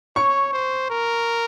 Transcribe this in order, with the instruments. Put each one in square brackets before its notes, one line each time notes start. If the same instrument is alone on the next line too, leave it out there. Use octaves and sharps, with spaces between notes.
[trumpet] C#5 [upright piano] C#6
[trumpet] C5
A#4